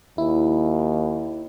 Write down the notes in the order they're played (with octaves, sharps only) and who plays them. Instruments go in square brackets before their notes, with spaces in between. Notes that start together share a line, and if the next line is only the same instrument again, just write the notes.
[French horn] D#2 [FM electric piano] E4